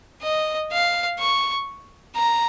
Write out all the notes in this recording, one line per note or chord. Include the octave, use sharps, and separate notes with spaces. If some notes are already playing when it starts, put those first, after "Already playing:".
D#5
F5
C#6
A#5